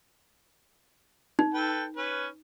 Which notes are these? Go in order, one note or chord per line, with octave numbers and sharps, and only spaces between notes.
D#4
A4 B4 G5
C#4 B4